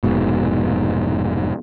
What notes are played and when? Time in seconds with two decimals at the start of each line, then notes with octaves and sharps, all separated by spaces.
0.03 F1 G#2 B2